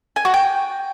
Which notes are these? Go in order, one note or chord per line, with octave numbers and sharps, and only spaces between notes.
G#5
F#4
G5